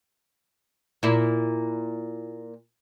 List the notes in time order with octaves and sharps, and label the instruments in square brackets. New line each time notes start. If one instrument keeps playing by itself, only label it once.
[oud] A#2 E4